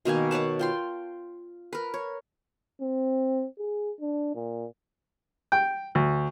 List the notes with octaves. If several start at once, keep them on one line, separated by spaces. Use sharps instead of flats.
B2 D#3 A#3 G#5
B4 C#5 F#5 A5
F4 G5 C6
A#4 B4
C#5
C4
G#4
D4
A#2
G5
D2